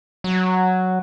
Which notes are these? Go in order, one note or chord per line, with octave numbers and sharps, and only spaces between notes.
F#3